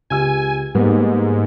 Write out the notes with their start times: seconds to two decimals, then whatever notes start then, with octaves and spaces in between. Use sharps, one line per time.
0.10 C#2 G4 G#5 E6
0.75 G#2 G3 A#3 B3